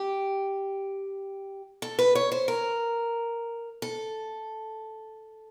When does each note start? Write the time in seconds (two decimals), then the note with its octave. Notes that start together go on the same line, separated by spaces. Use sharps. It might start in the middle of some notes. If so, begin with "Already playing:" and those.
Already playing: G4
1.82 A4
1.99 B4
2.15 C#5
2.32 C5
2.48 A#4
3.82 A4